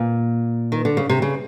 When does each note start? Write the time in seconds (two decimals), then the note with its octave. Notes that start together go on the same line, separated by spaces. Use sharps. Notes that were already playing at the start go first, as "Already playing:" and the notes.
Already playing: A#2
0.72 D#3
0.85 D3
0.97 C#3
1.09 C3
1.22 C#3